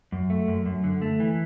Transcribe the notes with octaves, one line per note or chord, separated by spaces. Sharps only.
F#2
A3
F#2
F#2
D3
A3
E3